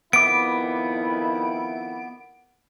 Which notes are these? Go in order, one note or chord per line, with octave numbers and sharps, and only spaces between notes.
F2 D#3 B3 E4 D6 D7